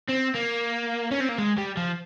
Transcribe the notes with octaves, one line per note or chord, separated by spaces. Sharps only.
C4
A#3
C#4
C4
A#3
G#3
G3
F3